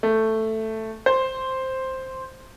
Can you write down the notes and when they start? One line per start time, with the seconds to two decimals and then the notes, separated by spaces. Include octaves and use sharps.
0.03 A3
1.06 C5